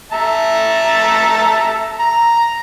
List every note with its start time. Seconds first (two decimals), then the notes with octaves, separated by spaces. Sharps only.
0.12 E5 A5 A#5
1.99 A#5